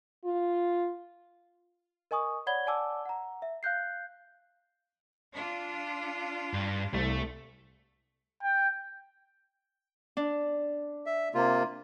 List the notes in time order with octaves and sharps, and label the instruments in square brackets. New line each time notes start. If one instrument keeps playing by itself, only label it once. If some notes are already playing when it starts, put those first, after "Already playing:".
[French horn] F4
[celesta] A#4 D#5 G#5 C#6 D#6
C#5 D5 F#5 B5 G#6 G7
D5 F#5 G#5 A5 D6 E6
F#5 A#5
E5
F5 F#6 G6 C7
[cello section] D4 F4
[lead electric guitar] G2
[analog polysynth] C2 [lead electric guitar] A3
[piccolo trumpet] G5
[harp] D4
[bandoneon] E5
C3 A#3 F4